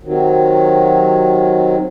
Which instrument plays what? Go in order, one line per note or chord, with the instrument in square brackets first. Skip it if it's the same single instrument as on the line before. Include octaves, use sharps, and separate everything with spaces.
[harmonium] C3 D#3 F#3